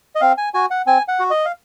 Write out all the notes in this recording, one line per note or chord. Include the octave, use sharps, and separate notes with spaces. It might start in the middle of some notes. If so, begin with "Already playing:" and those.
D#5
C4 F5
G#5
F#4 G#5
F#5
C4 G#5
F#5
F#4
D#5
F5